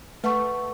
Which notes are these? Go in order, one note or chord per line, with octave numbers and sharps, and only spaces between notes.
A3 B4 F#5 C#6